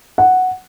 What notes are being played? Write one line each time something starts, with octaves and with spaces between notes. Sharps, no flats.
F#5